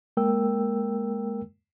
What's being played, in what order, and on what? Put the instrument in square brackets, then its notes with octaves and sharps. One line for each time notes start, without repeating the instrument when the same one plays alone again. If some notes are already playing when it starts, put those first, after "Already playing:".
[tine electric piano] G#3 A#3 A#4 G5 E6